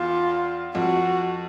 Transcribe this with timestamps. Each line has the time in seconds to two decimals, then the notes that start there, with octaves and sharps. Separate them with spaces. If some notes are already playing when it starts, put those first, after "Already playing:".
Already playing: E2 F4
0.75 F2 F#4